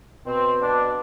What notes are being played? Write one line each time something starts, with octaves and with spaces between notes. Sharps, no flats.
B2 C4
B2 D4